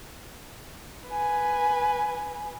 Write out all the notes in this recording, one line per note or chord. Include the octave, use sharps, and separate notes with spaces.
B4 G#5